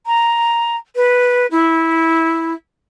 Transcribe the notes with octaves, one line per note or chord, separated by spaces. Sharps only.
A#5
B4
E4